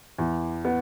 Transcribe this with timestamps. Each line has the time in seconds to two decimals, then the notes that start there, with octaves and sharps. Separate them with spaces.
0.18 E2
0.65 B3